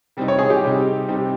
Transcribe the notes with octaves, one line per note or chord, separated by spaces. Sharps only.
C3 G3 C4 D#4
C#5
G#4
G4
C3 G3 C4 D#4
C3 G3 C4 D#4